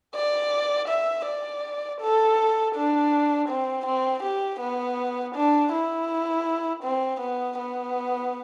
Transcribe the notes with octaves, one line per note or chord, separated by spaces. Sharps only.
D5
E5
D5
A4
D4
C4
C4
G4
B3
D4
E4
C4
B3
B3